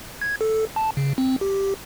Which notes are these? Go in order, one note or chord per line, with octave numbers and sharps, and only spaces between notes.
G#6
A4
A5
C#3
C4
G4